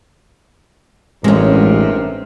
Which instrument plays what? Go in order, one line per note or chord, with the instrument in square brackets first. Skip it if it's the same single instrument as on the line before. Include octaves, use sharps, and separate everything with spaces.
[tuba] A1 [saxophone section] G2 C3 A#4 [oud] G#3 C#4